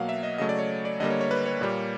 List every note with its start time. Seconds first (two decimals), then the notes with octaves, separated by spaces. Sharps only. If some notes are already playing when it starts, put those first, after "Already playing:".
Already playing: B2 F#3 A#3 F5 F#5
0.09 E5
0.23 D#5
0.38 C#3 F#3 A3 D#5
0.49 D5
0.59 C#5
0.85 D5
1.00 D3 G3 A#3 D#5
1.10 C#5
1.21 C#5
1.31 B4
1.46 C#5
1.61 A#2 G3 A#3